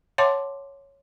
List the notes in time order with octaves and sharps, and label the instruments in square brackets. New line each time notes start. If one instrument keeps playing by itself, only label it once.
[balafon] C#5 E5 F#5 A5 C6 D6